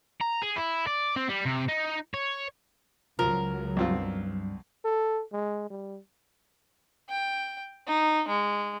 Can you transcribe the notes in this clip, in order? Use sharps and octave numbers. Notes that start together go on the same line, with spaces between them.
A#5
G#4
E4
D5
C4
G3
C3
D#4
C#5
C#2 F3 F#3 A#4
B1 G2 C4 F4
A4
G#3
G3
G5
D#4
G#3